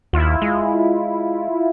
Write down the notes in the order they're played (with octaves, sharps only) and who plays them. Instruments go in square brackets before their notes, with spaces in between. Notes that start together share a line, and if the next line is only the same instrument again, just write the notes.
[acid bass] D#2 [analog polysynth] E4 F4
[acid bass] G#3